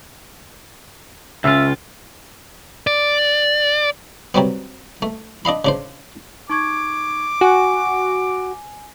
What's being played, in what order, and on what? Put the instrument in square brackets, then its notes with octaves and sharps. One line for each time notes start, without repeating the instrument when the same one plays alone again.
[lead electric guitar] C#2 F4 [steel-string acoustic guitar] C#3 [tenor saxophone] E5
[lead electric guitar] D5
[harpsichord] C3 F#3 G3 B3
A3
D4 D#5 F5 B5
C#3 D4 C5
[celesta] D#4 C#6 G#6 [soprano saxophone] D6
[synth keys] F#4 [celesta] G#5